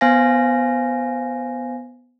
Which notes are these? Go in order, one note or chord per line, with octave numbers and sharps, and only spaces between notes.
B3 C5 F5 G#5 A#6